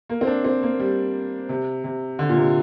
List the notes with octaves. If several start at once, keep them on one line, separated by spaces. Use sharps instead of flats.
A#3
C4
D4
C4
A#3
G3
C3
C3
D3
A#2
C3